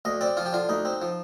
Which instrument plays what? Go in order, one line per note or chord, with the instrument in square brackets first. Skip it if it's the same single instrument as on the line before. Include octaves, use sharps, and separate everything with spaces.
[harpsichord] D2 D#5
C4 D5
F3 F4
G4
D3 F4
D2 D#4
C4
F3